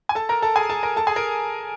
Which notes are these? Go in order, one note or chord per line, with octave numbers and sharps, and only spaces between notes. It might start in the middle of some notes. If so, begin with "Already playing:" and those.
G#5
A4 A5
A#4 A#5
A4 A5
G#4 G#5
A4 A5
A#4 A#5
A4 A5
G#4 G#5
A#4 A#5